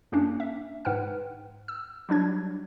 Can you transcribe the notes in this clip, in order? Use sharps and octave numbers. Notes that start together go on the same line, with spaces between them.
F#2 A#3 C#4 D4
E5
G#2 B4 F#5 G5 F6
E6
F#3 G3 D4 G#6